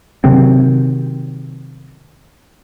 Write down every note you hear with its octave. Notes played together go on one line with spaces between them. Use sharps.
C3 D#3 F#3 C4